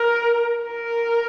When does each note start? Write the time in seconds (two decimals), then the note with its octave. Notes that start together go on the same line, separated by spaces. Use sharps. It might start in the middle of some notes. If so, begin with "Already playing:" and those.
Already playing: A#4
0.63 A#4